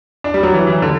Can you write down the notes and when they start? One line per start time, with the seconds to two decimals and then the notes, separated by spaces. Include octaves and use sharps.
0.24 D4
0.34 G3
0.43 F#3
0.54 E3
0.67 E3
0.82 D3